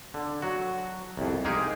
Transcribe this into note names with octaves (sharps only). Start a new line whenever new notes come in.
D3
F#3 F#4
C2 F2
G#3 A#3 D#4 G4 G#4 A#4